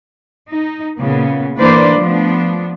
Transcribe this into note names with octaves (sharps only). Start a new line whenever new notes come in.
D#4
A#2 C#3 B3
E3 A#3 D4 B4 C5 D5
F3 A3 B3 D4